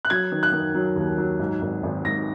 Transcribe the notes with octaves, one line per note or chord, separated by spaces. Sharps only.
F#6
F#3 G#6
D#3
F#6
D#3
F#3
D#2
F#3
G#2
G#1
G#1
G#2 A#6